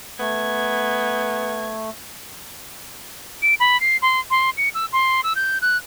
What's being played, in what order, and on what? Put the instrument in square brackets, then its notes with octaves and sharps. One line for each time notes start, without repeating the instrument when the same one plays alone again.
[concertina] A3 [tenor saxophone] B3 [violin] G#6
[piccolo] D7
B5
C7
C6
C6
C#7
E6
C6
E6
G6
F#6